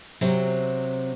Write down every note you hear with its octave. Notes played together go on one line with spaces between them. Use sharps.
C3 F#3 C4